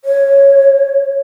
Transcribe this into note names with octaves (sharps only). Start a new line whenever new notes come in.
C#5